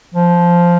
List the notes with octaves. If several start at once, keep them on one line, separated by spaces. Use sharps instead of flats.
F3